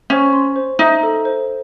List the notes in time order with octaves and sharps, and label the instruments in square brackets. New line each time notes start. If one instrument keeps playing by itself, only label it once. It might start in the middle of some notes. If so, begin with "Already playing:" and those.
[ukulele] C#4 [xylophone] C5
[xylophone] C6
C5
[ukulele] D#4 [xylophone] E5
[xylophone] A4
C5